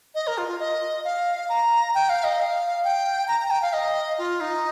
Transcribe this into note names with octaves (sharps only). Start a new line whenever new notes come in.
D#5
A#4
F4
F4
D#5
F5
A#5
G5
F5
D#5
F5
G5
A#5
A#5
G5
F5
D#5
F4
D#4